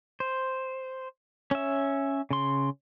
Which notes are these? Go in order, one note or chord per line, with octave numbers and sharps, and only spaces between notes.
C5
C#4 E5
C#3 C6